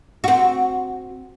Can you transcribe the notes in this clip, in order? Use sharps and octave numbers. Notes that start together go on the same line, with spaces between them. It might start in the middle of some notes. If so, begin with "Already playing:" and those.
C4 F#4